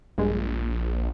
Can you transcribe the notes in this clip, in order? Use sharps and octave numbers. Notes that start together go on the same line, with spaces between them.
A#1 G2 G#3